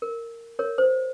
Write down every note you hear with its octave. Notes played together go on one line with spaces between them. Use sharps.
A#4
A#4 C#5
C5